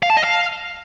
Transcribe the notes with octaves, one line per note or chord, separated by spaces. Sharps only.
F5
A5
D#5
F5